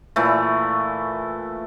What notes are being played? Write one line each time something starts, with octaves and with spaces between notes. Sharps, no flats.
A#2 E3 A3